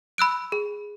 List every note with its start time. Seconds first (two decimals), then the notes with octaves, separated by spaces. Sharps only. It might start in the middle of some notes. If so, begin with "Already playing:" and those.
0.18 B5 E6 F#6 D7
0.52 G#4